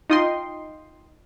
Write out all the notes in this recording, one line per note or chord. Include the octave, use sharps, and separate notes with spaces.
D#4 F4 D#5 G5 C6